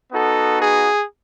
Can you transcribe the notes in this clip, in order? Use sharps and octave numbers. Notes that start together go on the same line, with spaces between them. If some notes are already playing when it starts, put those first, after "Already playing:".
B3 D#4 F#4 A4
G#4